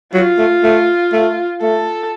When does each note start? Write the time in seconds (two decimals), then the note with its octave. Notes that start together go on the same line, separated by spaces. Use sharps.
0.14 F#3 F4
0.38 A3
0.64 A3
1.13 A3
1.62 A3 A4